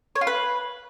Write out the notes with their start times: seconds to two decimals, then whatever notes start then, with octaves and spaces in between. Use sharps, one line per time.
0.15 C#5
0.21 F4
0.27 B4